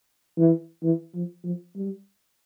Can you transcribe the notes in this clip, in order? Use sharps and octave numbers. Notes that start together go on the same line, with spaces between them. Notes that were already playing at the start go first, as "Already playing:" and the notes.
E3
E3
F3
F3
G3